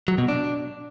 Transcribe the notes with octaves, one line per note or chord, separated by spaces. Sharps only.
F#3
B2
D4